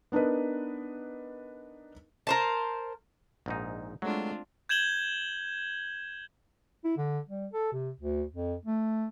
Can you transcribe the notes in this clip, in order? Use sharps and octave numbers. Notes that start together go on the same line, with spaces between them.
B3 D4 D#4 A#4 B4
A#4 C5 A5
A#1 G#2 D#4
F#3 G#3 A3 C4 D4 F4
G6 G#6 E7 F#7 G7
E4
D3
G3
A4
C3
D2
F2
A3